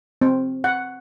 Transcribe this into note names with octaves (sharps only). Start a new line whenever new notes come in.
C4
F#5